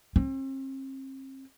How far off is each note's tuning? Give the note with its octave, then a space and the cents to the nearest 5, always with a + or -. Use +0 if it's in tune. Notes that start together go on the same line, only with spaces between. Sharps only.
C4 +40